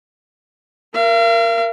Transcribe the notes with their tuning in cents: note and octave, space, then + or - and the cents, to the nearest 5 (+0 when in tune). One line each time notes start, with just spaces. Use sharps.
A#4 +0 F5 -45